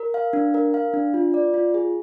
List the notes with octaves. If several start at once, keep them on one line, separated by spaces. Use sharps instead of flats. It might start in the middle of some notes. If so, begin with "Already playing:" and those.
Already playing: A#4
F5
D4
A#4
F5
D4
F4
D5
F4
G#4